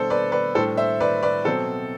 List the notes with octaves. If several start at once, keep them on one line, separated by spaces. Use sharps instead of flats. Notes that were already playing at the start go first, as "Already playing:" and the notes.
Already playing: B2 G3 D4 A4 C5
B4 D5
B4 D5
A2 G3 D4 A4 C5
C5 E5
B4 D5
B4 D5
B2 F#3 C4 A4 C5